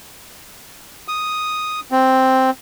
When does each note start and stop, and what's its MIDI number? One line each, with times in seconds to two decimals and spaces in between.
1.08 1.80 87
1.91 2.50 60